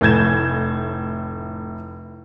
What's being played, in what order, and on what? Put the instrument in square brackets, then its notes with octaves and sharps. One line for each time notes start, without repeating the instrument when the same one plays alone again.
[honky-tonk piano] F1 A2 G6 G#6 E7